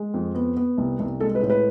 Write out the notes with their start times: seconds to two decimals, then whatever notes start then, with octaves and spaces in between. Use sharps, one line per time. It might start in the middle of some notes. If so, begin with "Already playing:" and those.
Already playing: G#3
0.14 F2
0.35 B3
0.57 B3
0.78 C2
0.99 C2
1.20 G#3 A4
1.35 B4
1.42 A2
1.50 B4